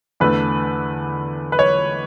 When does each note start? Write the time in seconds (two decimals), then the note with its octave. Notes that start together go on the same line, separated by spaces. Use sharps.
0.20 E2 D3 A3 D4 B4
1.52 B4
1.59 C#5